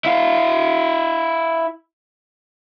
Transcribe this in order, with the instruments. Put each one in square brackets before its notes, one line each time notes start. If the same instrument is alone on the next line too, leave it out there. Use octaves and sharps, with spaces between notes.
[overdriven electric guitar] E4 F5